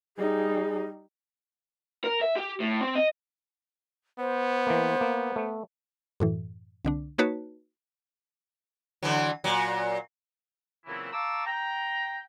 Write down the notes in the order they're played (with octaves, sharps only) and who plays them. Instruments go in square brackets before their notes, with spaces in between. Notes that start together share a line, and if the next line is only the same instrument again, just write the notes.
[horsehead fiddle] G3 D#4 [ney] G#4
[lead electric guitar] A#4
E5
G4
A2
C4
D#5
[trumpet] B3 [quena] C5
[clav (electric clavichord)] E3 A#3
A#3
A3
[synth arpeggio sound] F#2 A2 E3
C2 D3 D4
A#3 D#4 F#4 B4 C#5 A5
[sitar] D3 E3 F#3
A#2 F#3
[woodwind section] A#2 C#3 E3 F#3 C4 E4
F5 A5 A#5 C#6 D6 E6
G5 A#5